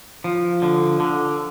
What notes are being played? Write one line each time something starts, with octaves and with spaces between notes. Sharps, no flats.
F3
D3
D3